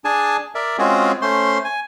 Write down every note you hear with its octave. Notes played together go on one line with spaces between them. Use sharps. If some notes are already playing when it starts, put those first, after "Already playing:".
D4 G#4 G#5 A5
A#4 D5 E5
G#3 C4 C#4 F4 F#4 G#4
A3 C#4 C5 C6
G#5